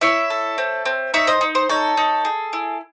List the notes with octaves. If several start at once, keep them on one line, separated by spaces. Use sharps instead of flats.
E4 C#5 E5
A4
C4
C4
D#4 C#5 E5
C5 D#5
D#4
C5
D#4 A4 C#5
D#4
G#4
E4